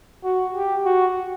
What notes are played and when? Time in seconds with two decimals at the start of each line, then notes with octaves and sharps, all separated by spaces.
0.24 F#4
0.55 G4
0.85 F#4